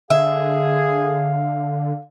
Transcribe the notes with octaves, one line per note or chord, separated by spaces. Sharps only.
D3 G#4 E5 F5